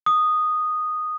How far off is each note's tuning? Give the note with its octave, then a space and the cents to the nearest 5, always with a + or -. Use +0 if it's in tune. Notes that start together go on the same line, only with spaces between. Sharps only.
D#6 -10